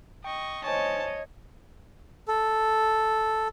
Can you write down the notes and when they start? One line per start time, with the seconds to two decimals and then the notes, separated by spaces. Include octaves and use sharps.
0.24 D#5 G5 C#6
0.64 C5 C#5 D#5 G#5 A5 C#6
2.28 A4